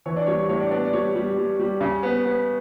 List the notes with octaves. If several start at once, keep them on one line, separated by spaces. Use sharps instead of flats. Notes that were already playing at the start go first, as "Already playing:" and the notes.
E3 C#5
D4 D5
G3 C#5
C#5
A2 C#5
D4 D5
B3 D4 D5
D5
G3 C#5
G3
G3
G3
C#3
B3
B3